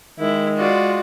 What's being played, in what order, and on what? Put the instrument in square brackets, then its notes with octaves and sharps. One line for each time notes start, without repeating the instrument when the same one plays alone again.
[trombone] D#3 [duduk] G#3 [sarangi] E4
[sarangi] F4 [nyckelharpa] F#4 D5